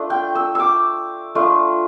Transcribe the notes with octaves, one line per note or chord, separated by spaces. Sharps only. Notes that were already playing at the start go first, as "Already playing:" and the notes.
Already playing: A3 D4 F4
G5
E6
D6 E6
A3 D4 F4